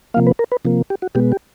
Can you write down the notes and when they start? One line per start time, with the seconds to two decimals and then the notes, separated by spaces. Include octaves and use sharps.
0.14 C3 F3 A#3 F5
0.26 B4
0.39 A#4
0.52 B4
0.65 C3 F3 A#3
0.90 G4
1.02 F#4
1.15 B2 G#3 B3 G4
1.32 G4